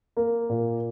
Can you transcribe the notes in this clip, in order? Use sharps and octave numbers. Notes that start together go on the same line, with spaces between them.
A#3
A#2